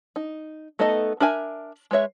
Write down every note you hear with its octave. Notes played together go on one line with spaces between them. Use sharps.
D#4
A3 B3 D#4 A4 D#5
D4 A#4 E5 G#5
G#3 B4 C#5 E5